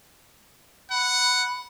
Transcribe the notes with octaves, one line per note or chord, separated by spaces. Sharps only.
F#5 B5